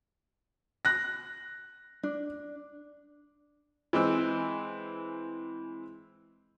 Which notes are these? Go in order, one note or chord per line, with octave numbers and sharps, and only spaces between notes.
F#6 A#6
D4
E3 G#3 C4 E6